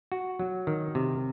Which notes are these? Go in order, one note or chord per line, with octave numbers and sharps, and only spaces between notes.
F#4
F#3
D#3
C3